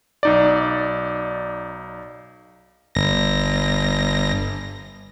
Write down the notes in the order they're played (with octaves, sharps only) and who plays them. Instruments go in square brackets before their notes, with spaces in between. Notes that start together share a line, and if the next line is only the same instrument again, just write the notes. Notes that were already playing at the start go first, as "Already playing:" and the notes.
[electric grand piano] B1 D#4 D5
[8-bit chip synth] G1 A#6